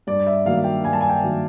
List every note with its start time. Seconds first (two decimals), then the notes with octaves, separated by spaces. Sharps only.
0.07 G2 D5
0.26 E5
0.45 D#3 F#3 A#3 F5
0.64 G5
0.84 G2 G#5
0.93 A5
1.01 G#5
1.10 G5
1.23 D#3 F#3 A#3